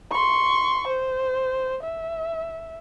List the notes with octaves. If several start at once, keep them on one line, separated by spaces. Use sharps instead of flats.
C6 C#6
C5
E5